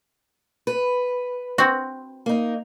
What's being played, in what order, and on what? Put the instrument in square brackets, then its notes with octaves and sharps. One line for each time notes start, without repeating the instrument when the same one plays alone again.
[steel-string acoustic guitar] B4
[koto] C4 F#4
[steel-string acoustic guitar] A#3 D#4